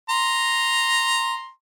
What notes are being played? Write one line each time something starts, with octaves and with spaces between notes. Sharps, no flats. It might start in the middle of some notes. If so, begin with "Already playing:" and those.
A#5 C6